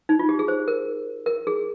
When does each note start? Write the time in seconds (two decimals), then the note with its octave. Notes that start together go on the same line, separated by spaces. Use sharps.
0.09 D#4
0.19 F4
0.29 G4
0.39 G#4
0.48 C5
0.68 A#4
1.26 A#4
1.47 G#4